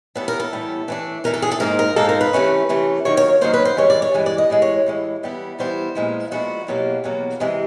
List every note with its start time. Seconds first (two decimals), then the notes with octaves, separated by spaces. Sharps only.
0.15 A2 E3 G3 B3 A4
0.28 A#4
0.40 A4
0.52 A2 E3 G3 B3
0.88 E3 A3 D4
1.24 E3 A3 D4 A#4
1.34 A4
1.42 G#4
1.51 A4
1.60 G#2 F3 A#3 D#4 A#4
1.79 A#4
1.96 G#2 F3 A#3 D#4 A4
2.09 A#4
2.21 B4
2.33 C3 E3 A3 C#4
2.69 C3 E3 A3 C#4
3.05 D#3 F#3 A#3 C#5
3.17 C#5
3.41 D#3 F#3 A#3 C5
3.54 B4
3.65 C5
3.77 G2 E3 G#3 C#5
3.90 D5
4.02 C#5
4.14 G2 E3 G#3
4.26 D5
4.38 D#5
4.50 A2 E3 G#3
4.62 C#5
4.86 A2 E3 G#3
5.23 E3 G3 B3 E4
5.59 E3 G3 B3 E4 C5
5.95 A#2 F3 G#3 B3 E4
6.31 A#2 F3 G#3 B3 E4 F#4
6.67 E2 B2 F#3 A#3 G4
7.04 E2 B2 F#3 A#3
7.40 C3 E3 G#3